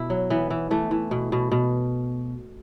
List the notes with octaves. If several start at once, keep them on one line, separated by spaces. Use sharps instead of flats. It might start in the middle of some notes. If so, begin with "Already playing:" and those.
Already playing: B2 E4
F#3
E3 B3
E3
E3 A3
E3
B2
B2
B2